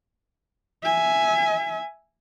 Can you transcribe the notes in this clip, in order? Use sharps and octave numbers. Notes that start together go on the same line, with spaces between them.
E5 G#5